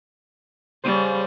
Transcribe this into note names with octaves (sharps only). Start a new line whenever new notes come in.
C#3 G3 C5